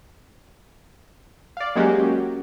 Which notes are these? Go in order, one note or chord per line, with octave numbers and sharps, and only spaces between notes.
D5 F5
F#3 G#3 A#3 C#4 F#4 G4